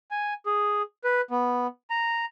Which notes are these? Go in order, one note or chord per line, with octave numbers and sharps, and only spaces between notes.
G#5
G#4
B4
B3
A#5